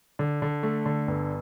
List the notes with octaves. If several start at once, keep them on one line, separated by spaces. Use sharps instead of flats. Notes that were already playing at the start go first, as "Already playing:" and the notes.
D3
D3
A3
D3
G1